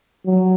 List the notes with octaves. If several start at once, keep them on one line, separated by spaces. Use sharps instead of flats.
F#3